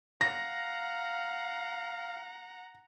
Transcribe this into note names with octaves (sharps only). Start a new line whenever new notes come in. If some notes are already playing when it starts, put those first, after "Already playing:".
F5 F#5 A#5 A#6